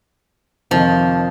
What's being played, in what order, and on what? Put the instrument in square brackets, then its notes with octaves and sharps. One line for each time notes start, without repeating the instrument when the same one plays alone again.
[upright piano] F2 C3 D#3 [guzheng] F3